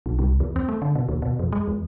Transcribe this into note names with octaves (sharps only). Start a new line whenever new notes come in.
B1
C2
E2
C4
A3
D3
B2
D#2
B2
F2
G#3
E2